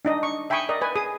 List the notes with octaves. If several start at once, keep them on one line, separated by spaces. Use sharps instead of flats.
D4 D#4 D#5
C#6
E5 G5 G#5 B5 C#6 D#6
A#4 D5 D#5
B4 G#5
G#4 D#6